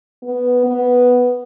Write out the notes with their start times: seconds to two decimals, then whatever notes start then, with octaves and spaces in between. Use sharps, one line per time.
0.23 B3
0.66 B3